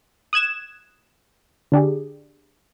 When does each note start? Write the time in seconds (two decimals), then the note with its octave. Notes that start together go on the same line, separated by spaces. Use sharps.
0.33 D#6 F#6 G#6 E7
1.72 D3 D4 G4 G#4